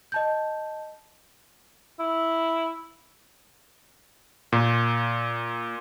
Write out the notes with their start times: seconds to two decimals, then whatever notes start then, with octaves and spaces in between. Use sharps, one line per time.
0.12 D#5 A5 G6
1.99 E4
4.52 A#2